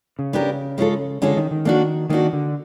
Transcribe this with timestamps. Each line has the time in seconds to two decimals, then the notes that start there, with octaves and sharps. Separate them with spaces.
0.19 C#3
0.33 B3 D4 G4 A#4
0.78 G#3 C#4 F4 A4
1.22 D3 G#3 C#4 F4 A4
1.37 D#3
1.51 D#3
1.65 A#3 D4 F#4
2.10 D#3 A#3 D4 F#4
2.33 D3